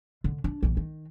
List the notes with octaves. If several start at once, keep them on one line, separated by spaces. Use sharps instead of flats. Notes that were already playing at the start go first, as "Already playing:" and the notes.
D3
D4
A#1 E3
D#3